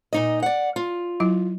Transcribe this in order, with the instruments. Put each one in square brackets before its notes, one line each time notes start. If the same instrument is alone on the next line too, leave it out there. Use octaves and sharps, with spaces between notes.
[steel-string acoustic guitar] A#2 D#4 D#5
D5 F#5
F4
[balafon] F#3 E4